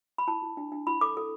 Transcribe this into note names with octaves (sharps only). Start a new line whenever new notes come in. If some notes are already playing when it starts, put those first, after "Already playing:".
B5
E4 A5
E4
D4
D4
E4 B5
A4 D6
A4